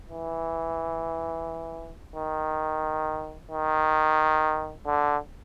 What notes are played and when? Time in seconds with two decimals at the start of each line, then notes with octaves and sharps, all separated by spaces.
0.10 E3
2.16 D#3
3.51 D#3
4.87 D3